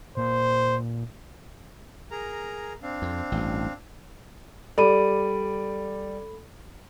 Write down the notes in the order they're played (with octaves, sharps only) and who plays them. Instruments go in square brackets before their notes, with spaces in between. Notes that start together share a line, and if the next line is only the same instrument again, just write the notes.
[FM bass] A#2 [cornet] C5
[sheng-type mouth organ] G#4 A#4 A#5
C4 D4 F5
[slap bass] F2
A1 G2
[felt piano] G3 D5 [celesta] A4 B5 D#7